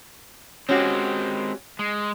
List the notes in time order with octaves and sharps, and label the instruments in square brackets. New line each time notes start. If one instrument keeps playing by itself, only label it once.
[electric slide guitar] G#3 C4 [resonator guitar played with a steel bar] C#4 F#4 G4
[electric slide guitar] G#3